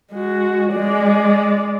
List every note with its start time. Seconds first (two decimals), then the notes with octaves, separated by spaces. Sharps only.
0.12 G#3 F#4
0.72 G#3 D5